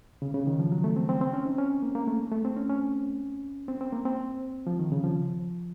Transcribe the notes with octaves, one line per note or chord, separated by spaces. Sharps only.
C#3
C#3
D#3
F3
F#3
A3
C4
C4
C4
C#4
D#4
C#4
A#3
A#3
A3
A3
C4
C#4
C#4
C4
C4
A#3
C4
F3
D#3
C#3
F3